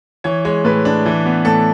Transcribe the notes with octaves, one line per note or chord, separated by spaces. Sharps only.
E3 C#5
G#3 C#5
A2 B4
D4
E3
B3
A2 A4